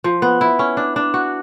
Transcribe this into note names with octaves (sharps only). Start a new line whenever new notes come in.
F3
B3
E4
C#4
D4
D4
F#4